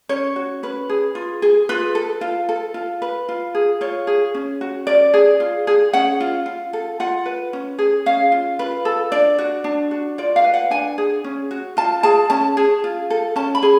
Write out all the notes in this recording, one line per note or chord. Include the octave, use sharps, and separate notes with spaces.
C#4 C#5
F#4
C#4 B4
G#4
F4
G#4
F4 B4
A4
F4
A4
F4
B4
F4
G#4
F4 C#5
G#4
C#4
F#4
C#4 D5
G#4
F4
G#4
C#4 F#5
F4
F4
A4
F4 F#5
B4
C#4
G#4
C#4 F5
F4
F4 B4
A4
D4 D5
F#4
D4
F#4
F4 D5
F5
B4
F#5
D4 G#5
G#4
C#4
F#4
F4 A5
G#4 A5
C#4 A5
G#4
F4
A4
C#4 A5
B5
G#4